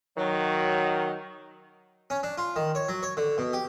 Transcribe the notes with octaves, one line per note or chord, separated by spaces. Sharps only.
D#3 F#3
C#4
D4
F4
D#3
C#5
F#3
C#5
D3
B2
G4